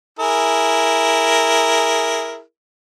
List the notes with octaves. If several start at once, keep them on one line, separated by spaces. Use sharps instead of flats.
E4 G#4 A#4